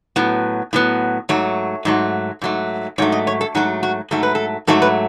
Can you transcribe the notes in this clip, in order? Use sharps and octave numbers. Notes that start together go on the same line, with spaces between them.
A2 F#3 B3
A2 F#3 B3
G#2 F#3 A3 C#5
G#2 F#3 A3
G#2 F#3 A3
G#2 F#3 A3 C#5
D#5
C#5
A4
G#2 F#3 A3 F#4
F#4
G#2 F#3 A3 A4
B4
A4
G#2 F#3 A3 A4
B4